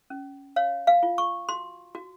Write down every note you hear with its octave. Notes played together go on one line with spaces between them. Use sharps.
C#4
C#5 F5
F5
F4
C#6
F#4 C6
F#4